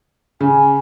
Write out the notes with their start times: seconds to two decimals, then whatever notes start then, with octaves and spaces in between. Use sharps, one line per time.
0.41 C#3 G#5